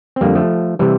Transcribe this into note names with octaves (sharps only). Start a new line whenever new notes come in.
C4
F2 D3 G3 A#3
F3 A3
C3 E3 G3